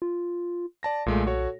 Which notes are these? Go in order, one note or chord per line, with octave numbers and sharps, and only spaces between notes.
F4
D5 A5 A#6
B1 A#2 G#3 A3
F#4 A4 C#5